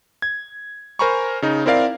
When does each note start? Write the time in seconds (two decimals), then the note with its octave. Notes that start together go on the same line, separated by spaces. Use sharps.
0.22 G#6
0.99 A#4 C5 G#5 A#5 B5 C#6
1.42 C#3 D#4
1.66 C4 E4 A#4 D5 F5